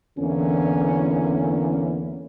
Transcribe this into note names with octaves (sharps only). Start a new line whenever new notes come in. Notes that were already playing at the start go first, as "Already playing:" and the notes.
E2 D3 E3 A#3 C#4